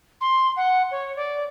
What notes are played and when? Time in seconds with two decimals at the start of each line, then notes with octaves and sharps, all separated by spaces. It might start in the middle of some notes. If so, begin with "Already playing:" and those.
0.21 C6
0.56 F#5
0.91 C#5
1.16 D5